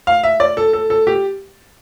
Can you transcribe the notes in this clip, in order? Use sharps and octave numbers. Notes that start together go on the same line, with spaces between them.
F5
E5
D5
A4
A4
A4
G4